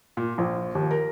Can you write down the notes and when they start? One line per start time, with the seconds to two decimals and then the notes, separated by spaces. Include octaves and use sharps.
0.17 A#2
0.38 A#1
0.75 D#2
0.91 A#4